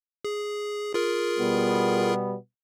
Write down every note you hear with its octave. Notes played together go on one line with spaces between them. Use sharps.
G#4
F4 G#4 A#4
B2 G3 B3